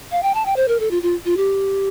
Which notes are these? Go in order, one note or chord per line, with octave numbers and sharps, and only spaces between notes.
F5
G5
A5
G5
C5
A#4
A4
F4
F4
F4
G4